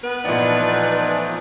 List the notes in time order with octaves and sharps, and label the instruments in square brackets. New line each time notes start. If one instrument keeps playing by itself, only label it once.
[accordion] B3 [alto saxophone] B4
[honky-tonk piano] A#2 B3 [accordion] E3 F3 A3 [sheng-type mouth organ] D#4 D5